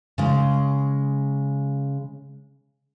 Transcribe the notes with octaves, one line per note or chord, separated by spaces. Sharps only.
C#3 G#3